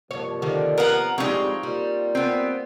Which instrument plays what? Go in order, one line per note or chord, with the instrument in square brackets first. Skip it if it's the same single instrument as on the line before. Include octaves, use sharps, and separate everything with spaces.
[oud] G2 C#5 [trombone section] C3 F3 A#3
[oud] D3 D#3 G3
[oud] B3 [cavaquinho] A#4 F5 F#5
[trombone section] A2 G3 [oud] F3 G#3 [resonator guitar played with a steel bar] C4 [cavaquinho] D#4 C#5
[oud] G3 [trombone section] A#3 F4
[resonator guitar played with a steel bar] B3 C4